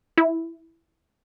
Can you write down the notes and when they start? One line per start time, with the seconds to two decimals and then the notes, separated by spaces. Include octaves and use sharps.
0.18 E4